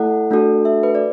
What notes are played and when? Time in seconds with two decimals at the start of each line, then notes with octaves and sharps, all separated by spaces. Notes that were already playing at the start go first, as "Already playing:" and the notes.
Already playing: A3 E4 A4 F#5
0.31 A3 D4 F#4 A4
0.65 E5
0.83 B4
0.95 D5